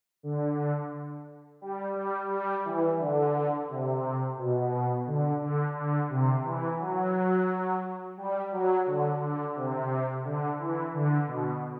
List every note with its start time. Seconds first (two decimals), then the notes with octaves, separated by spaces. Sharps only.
0.23 D3
1.61 G3
1.96 G3
2.30 G3
2.65 E3
2.99 D3
3.69 C3
4.37 B2
5.07 D3
5.42 D3
5.75 D3
6.10 C3
6.44 E3
6.79 F#3
8.17 G3
8.52 F#3
8.86 D3
9.20 D3
9.55 C3
10.24 D3
10.59 E3
10.93 D3
11.27 B2